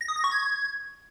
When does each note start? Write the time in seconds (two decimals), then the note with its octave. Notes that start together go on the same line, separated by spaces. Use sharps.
0.01 A#6
0.08 D#6
0.16 A#6
0.24 C#6
0.32 G#6